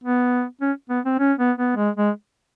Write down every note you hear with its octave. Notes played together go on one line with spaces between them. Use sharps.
B3
C#4
B3
C4
C#4
B3
B3
G#3
G#3